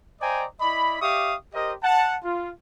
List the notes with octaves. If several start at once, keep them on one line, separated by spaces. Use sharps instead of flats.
C5 D5 D#5 G5 G#5 A#5
E4 D5 D#5 B5
G4 D5 E5 F5 C#6 D#6
G4 A#4 C5 D#5
F#5 A5
F4